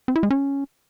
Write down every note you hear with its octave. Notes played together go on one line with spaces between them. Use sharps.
C4
E4
G#3
C#4